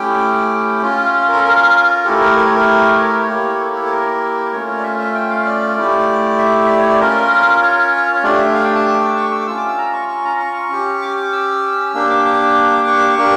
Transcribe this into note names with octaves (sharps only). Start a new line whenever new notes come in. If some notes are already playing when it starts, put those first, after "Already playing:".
Already playing: A3 C#4 E4 G4 G5
C#4 F4
A#4
A4
A#4
A3 E4 G4 A4
A#4
A#4
C#5
A#4
C#5
A#4
C#5
A#3 E4 G4
A4
A4
C#5
A#4
A3 C#4 F4 C#5
C#5
D5
E5
E5
G5
F5
D5
A3 E4 G4
E5
E5
D5
C#5
D5
C#4 F4 A#4
C#5
C#5
A3 D4 G4 D5
E5
F5
G5
A5
D6
E6
C#6
E6
D6
C#4 F4 E6
D6
E6
A#5
C#6
C#6
A#5
C#6
C#4 G4
D6
D6
E6
A#3 D4 G4 E6
D6
D6
C#6
D6
C#6
A#3 D4 G4